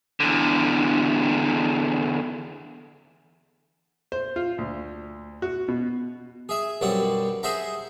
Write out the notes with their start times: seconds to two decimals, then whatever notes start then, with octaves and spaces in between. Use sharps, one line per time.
0.20 E2 D3
4.12 C5
4.36 F4
4.58 D2
5.42 F#4
5.68 B2
6.49 G#4 E5
6.81 B1 F#2 G3 C4 F#5
7.43 G#4 C5 E5 F#5 A#5